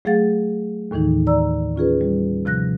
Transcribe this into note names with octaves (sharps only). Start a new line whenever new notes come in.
F#3 A3 G#4 F5 F#5 A6
D#2 A2 D#3 E3 D#4
D5 A#5 E6
C#4 F4 G#4 B4
G3
C3 F3 F#6 A#6